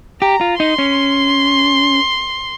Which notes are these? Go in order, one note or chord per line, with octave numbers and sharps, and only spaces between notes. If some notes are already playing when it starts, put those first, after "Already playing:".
G4 A#5
F4
D#4 C6
C#4